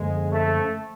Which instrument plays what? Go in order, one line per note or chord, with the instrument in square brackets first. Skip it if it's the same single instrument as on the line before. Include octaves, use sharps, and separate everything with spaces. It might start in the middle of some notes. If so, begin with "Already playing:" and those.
Already playing: [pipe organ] F#2 D3 F3 A#3 [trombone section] G#3
[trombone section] A3